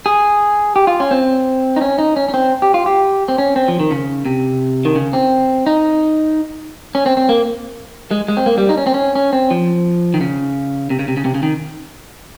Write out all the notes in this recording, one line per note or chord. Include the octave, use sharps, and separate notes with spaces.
G#4
G4
F4
C#4
C4
D#4
C#4
D#4
C#4
C#4
C4
G4
F4
G4
C4
C#4
C4
F3
D#3
C#3
C3
D#3
C#3
C4
D#4
C#4
C4
C4
A#3
G#3
G#3
C4
A#3
G3
D#4
C#4
C4
C#4
C#4
C4
F3
D#3
C#3
C3
C#3
C3
C#3
C3
C#3
D#3